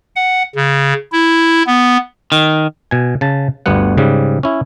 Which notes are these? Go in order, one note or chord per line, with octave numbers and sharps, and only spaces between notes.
F#5
C#3
E4
B3
D#3
B2 G#5
C#3 A5
G1 D2 G3 B3 F#5
G#2 C#3 G3
C#4 E4